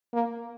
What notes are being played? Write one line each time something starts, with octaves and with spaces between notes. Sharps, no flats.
A#3